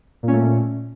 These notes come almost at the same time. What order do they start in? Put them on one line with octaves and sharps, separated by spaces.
A#2 C#4 A3